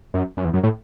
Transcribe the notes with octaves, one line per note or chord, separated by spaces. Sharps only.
F#2
F#2
E2
F#2
A2